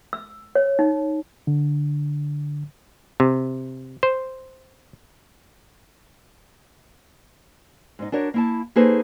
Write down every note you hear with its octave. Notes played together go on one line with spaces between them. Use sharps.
E6
C#5
D#4
D3
C3
C5
G#2 D#4
D4 F#4 A#4 C#5
A#3 E4 A5
A#3 D#4 G#4 A4 B4 C5